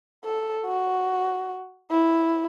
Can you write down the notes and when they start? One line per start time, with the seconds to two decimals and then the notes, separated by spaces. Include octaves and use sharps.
0.25 A4
0.66 F#4
1.91 E4